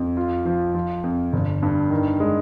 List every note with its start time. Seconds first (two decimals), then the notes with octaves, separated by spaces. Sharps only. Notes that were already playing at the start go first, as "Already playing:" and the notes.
Already playing: F2
0.17 F4
0.45 F3
0.75 F3
1.04 F2
1.33 G1
1.62 G2
1.90 D#3
2.20 G#3